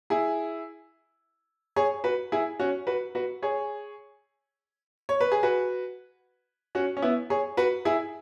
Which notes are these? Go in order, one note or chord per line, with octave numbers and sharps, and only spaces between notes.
E4 G#4
G#4 C#5
F#4 B4
E4 G#4
C#4 F#4
F#4 B4
F#4 B4
G#4 C#5
C#5
B4
G#4
F#4 B4
C#4 F#4
C#4
B3 E4
G#4 C#5
F#4 B4
E4 G#4